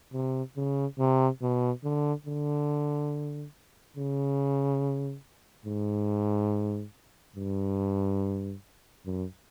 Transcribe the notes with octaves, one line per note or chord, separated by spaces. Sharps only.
C3
C#3
C3
B2
D3
D3
C#3
G#2
G2
F#2